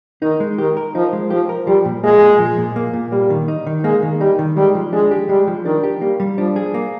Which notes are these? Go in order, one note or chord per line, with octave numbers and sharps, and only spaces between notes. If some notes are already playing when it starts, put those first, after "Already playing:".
D#3 D#4
G#3
D#3 G4
A#4
F3 D#4
G#3
F3 G4
A#4
F3 G3
A#2
G#3 A#3
A#2
F3
A#2
A#3
A#2
G3 A#3
D#3
D#4
D#3
G#3 A#3
D#3
G3 D#4
D#3
G3 G#3
F3
G#3 D4
G4
G3 G#3
F3
D#3 D4
G4
G3 A#3
G3
F3 D4
G#4
A#3